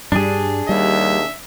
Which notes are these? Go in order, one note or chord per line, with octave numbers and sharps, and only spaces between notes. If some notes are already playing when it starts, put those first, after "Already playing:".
G2 G3 D4 G#4
D#2 G3 E5